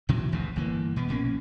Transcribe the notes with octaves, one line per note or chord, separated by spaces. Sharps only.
A#1 C3 E3 F#3
G#1 D2 G2 B2
G1 E3 A#3
B2 B3
A#1 B2 A#3 C#4